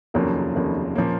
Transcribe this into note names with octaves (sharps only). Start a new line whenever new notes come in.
F1 D#2 C#3 F3 F#3 A#3
F1 D#2 C#3 F3
A#2 F3 A#3 C#4